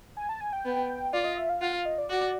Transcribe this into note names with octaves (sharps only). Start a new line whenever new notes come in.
G#5
A5
G#5
G5
B3
F4 D5
D#5
E5
F5
F4 F#5
F5
D#5
D5
F#4 D5